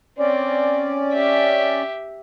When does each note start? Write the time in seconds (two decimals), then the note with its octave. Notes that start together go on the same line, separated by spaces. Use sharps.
0.19 C4 C#4 D5
1.13 G4 E5